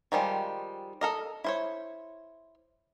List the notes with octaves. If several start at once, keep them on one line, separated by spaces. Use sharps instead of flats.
D#3 F3 G3 G#3
A4 A#4 D#5
E4 C5 C#5